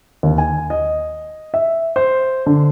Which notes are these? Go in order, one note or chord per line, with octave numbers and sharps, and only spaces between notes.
D#2
G#5
D#5
E5
C5
D3